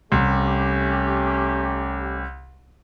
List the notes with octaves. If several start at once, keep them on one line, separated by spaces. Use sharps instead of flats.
C2 A3 C#4 G4